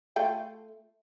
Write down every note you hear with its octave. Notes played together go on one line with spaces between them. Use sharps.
A3 F4 G5